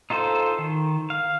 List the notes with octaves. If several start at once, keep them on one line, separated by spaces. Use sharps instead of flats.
D#4 F4 A4 C5
D#3
F5